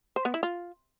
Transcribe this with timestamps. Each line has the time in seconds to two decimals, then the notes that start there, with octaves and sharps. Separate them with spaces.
0.16 C5
0.25 B3
0.34 E4
0.43 F4